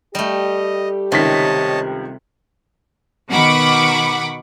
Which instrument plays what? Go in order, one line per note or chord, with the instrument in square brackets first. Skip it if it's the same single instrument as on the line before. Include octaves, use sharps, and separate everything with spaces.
[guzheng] G3 A3 [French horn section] G4 [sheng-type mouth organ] D#5
[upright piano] C#2 D#3 B6 [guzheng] C3 [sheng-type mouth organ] C#5 D#5 A5
[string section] B2 D#3 F#5 B5 C#6 D6